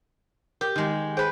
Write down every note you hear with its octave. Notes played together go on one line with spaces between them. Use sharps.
G4 A#4 D#6
D#3 G#3
G#4 B4 C5 G5